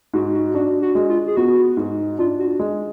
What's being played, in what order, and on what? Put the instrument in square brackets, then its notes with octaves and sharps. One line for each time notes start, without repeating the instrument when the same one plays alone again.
[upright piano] G#2 [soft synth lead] F#4
[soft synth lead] F#4
[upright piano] D4 [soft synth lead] F#4
[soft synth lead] F#4
[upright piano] G#3
[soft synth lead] F4
G#4
[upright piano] B3 [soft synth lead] F#4
[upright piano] G#2
[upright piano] D4 [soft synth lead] F4
[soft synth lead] F#4
[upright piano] G#3